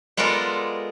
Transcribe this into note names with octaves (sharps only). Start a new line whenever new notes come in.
G#3 B3 F4 A4 A#4 D5